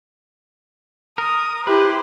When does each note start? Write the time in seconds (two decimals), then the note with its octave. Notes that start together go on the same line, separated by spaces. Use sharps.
1.18 A#4 D#6
1.67 E4 G4 B4 C5